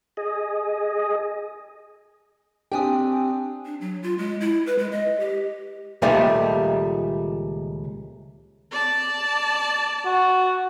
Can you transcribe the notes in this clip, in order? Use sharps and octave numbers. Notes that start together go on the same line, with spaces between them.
G#4 D#5
C4 D4 G4 G5 G#5 D#6
D4
F#3
F4
G#3
E4
B4
G#3
D#5
G4
C#2 A#2 D#3 F3 G3 A3
D5 A5
F#4